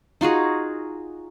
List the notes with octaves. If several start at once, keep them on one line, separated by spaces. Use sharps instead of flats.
D#4 F4 F#4 G#4